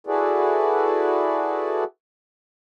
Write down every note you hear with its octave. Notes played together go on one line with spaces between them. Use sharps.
E4 F#4 G#4 A4 B4 D5